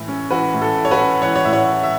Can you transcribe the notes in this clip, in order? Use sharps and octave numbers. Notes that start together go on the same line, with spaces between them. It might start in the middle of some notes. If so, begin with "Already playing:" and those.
Already playing: A2 E3 E4
C#4
E3 F#4 B4
A2
A4
E4
C#5
F#4 B4
C#4
E3 C#5 F#5
C#5
A2 E5
C#5 F#5
E4
E5